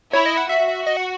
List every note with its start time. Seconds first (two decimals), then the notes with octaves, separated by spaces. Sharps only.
0.13 E4 C#5
0.26 D#5
0.37 F#5
0.49 F#4 E5
0.68 E5
0.87 D#5
0.97 F#5